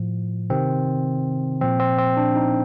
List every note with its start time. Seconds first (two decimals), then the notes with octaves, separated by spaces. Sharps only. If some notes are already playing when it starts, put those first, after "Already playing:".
Already playing: A2 F3
0.50 C3 D#3 C4
1.61 A#2 F3 C4
1.80 C4
1.99 C4
2.17 D4
2.36 D#4